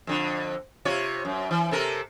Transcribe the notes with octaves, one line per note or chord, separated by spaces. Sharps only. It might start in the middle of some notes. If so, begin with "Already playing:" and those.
F2 D3
C3 F4 C#5
F#2
E3
C3 A4 A#4